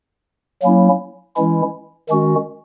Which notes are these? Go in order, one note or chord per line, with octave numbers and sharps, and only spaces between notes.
F#3 A#3 C#4 E4
E3 G#3 C#4 E4
D#3 G#3 C#4 F#4